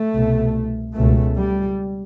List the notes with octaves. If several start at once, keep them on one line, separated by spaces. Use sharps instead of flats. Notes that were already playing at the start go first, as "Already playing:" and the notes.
Already playing: A3
C2 B2
C#2 B2 A3
G3